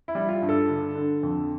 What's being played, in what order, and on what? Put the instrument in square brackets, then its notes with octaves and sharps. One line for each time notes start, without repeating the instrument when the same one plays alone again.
[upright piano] E4
[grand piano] G3
[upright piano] F4
[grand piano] G2
[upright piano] A4
[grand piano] D3
D3
F2